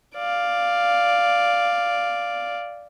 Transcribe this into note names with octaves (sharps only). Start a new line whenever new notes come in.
D5 F5